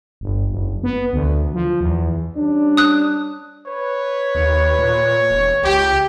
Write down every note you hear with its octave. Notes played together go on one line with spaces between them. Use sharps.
G1
F#1
B3
D2
F3
E2
G3 C#4 D4
D#6 F#6
B4 C#5
D#2
A#2
E1
C#2 G4